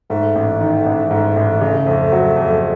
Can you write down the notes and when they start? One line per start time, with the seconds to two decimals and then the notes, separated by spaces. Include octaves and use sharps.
0.10 G#2 A3
0.35 A1
0.61 D#3
0.86 A1
1.11 G#2
1.37 A1
1.61 C#3
1.86 F2
2.12 F#3
2.36 F2